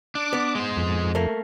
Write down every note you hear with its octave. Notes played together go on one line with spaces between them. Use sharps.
D4 D6
B3
G#3 C5
F2
A3 A#3